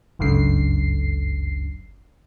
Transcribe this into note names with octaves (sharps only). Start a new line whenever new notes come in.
G1 C#2 F#2 D3 C7